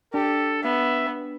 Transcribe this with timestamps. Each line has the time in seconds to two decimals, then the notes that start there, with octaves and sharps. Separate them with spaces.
0.14 D4 G4 A4
0.63 B3 E5